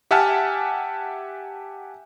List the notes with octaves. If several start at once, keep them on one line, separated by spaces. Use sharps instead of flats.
G4 E5 F#5 G#5 A5 F6